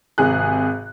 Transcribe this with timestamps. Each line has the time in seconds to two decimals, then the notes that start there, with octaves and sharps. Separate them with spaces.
0.18 G#1 C3 G#4 F#6